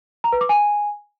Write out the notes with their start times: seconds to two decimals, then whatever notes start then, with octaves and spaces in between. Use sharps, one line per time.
0.24 A#5
0.32 B4
0.41 D6
0.49 G#5